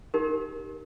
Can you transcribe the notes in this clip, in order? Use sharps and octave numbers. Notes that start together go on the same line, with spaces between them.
D#4 G4 A#4